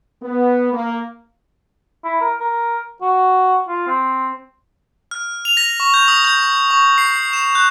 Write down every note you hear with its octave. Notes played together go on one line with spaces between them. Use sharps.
B3
A#3
E4
A#4
A#4
F#4
F4
C4
F6
F7
A#6
C#6
G6
D#6
G6
C#6
C7
E7
F#6